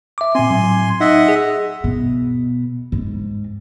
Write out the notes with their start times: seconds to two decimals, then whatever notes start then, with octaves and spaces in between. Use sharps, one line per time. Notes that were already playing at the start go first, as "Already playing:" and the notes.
0.18 E5 D6
0.35 A#2 C4 G#5 C6
0.50 A2 F#3
1.00 D#4 D#5 E5 F#5
1.28 G#4
1.84 B2
2.92 G#2